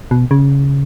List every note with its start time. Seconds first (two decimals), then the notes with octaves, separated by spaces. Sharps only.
0.11 B2
0.31 C#3